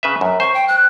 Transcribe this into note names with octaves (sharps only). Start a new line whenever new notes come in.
C#3 B4 E5
F#2
C5 C#6
G5
F#6